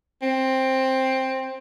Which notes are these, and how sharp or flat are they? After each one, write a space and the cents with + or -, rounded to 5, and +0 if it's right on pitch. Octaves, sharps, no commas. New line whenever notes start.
C4 +10